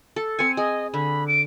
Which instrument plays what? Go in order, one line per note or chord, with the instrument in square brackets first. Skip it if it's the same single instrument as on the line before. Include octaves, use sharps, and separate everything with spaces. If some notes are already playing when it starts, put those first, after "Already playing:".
[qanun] A4
[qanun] C4 G#5 [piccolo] C#7
[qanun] G#4 [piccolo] D#5
[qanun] D3 [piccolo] B5
[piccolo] D7